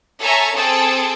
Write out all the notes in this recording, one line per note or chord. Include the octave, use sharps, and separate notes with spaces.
A4 C#5 E5 G#5 A#5 C#6
C4 G#4 A4 G5 A5